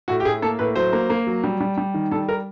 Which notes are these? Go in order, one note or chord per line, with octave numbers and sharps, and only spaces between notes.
A2 F#4
G4
A2 G#4
A#3 A4
A2 B4
F#3 C5
A#3
A#3
F#3
G3
G3
G3
D#3
G3 A4
A#4